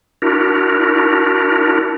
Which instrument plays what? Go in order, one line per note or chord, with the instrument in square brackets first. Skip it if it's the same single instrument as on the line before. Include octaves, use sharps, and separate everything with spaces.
[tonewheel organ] D4 E4 F#4 A#4